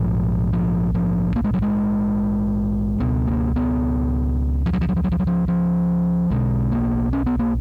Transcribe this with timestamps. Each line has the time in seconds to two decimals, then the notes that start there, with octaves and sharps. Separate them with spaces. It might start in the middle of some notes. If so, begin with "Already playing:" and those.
Already playing: A#1 G#2 F3
0.53 F3
0.94 F3
1.36 A#3
1.44 G#3
1.54 F#3
1.62 G#3
3.00 C#2 B2 B3
3.28 A#3
3.56 B3
4.66 F3
4.73 F#3
4.81 F3
4.89 F#3
4.96 F3
5.04 F#3
5.12 F3
5.20 F#3
5.27 F3
5.48 F3
6.30 B1 B2 G#3
6.72 A#3
7.13 C#4
7.26 B3
7.39 A#3